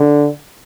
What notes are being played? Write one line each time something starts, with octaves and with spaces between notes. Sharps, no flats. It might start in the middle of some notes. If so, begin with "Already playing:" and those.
Already playing: D3